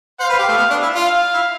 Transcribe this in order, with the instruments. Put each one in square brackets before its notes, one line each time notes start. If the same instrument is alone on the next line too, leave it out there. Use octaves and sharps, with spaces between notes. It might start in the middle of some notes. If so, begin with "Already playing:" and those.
[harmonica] C5 [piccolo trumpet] F5
[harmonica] B4
G4
A3
B3
D4
E4
[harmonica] F4 [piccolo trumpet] F5
[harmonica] E4